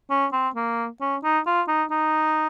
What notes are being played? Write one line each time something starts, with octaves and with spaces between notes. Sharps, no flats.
C#4
C4
A#3
C#4
D#4
F4
D#4
D#4